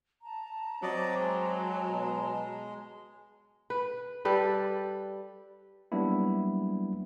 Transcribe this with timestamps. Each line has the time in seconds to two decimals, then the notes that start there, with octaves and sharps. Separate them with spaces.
0.22 A5 A#5
0.83 F#3 C4 D5 D#5 D6
1.18 G#3
1.89 B2
3.70 B4
4.25 G3 A4 B4
5.92 F#3 G3 A#3 B3 D4 E4